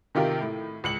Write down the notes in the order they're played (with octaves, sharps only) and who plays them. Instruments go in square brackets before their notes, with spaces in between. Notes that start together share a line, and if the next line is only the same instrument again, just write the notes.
[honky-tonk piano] C3 D#3 F4 G4 A#4
A2
C#2 C#7 F#7